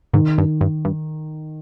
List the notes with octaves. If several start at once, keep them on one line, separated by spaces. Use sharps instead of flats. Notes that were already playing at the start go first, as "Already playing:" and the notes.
G#2 D#3
G2
G2
G2